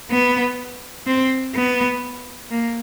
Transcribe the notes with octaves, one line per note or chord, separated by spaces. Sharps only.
B3
C4
B3
A#3